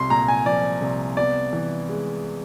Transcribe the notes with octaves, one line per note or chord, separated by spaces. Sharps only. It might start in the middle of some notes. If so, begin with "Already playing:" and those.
Already playing: C2 C6
A#2 A#5
G#5
F3 D5
C2
B3 D5
E3
G#3